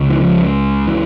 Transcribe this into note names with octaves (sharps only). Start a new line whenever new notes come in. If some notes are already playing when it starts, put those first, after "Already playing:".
Already playing: C#2 C#3
E3
F3
E3